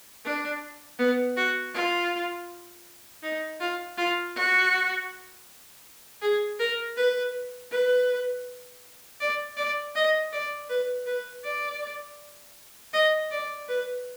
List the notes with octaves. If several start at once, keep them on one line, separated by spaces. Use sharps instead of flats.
D4
B3
F#4
F4
D#4
F4
F4
F#4
G#4
A#4
B4
B4
D5
D5
D#5
D5
B4
B4
D5
D#5
D5
B4